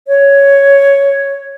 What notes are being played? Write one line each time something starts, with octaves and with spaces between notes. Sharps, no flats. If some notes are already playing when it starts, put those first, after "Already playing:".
C#5